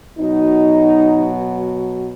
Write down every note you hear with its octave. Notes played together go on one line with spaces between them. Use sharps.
B2 F#3 D#4